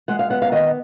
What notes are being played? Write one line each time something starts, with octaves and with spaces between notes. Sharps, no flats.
G#3 F#5
F5
B3 F#5
F5
D#3 D#5